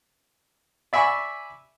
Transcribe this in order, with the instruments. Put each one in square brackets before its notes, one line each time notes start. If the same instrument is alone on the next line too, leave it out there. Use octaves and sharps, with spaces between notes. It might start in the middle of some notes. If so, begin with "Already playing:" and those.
[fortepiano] D5 E5 G#5 B5 C#6